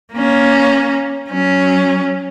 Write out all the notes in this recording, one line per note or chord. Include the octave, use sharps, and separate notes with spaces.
A#3 C#4
F#3 C#4